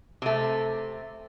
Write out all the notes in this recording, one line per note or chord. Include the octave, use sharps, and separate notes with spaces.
C3 A3